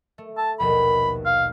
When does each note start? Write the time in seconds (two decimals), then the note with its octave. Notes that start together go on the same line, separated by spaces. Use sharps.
0.18 A3
0.37 A5
0.60 A#1 D#2 B2 B5
1.25 F5